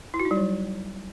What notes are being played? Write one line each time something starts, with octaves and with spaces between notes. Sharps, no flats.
E4
F#4
D#4
G3
F#3